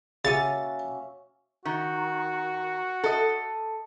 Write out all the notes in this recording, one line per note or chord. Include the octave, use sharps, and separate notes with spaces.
C#3 A#3 C#4 F#4 E5 C#6 D#6 A6
D#3 F#4
A4 D#5